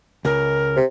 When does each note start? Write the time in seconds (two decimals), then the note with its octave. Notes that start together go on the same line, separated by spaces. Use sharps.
0.25 C#2 A#4
0.76 C3